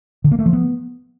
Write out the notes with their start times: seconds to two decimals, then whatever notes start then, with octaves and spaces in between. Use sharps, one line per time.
0.24 D3
0.32 A#3
0.39 A3
0.46 F3
0.53 B3